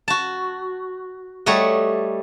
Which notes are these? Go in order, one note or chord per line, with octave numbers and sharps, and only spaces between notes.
F#4 A5
G3 A3 C#5 D#5 F#5